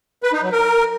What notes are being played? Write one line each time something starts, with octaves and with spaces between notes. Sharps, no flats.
B4
D#4
F#3
A#4